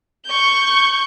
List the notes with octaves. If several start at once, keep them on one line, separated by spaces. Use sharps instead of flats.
C#6 G6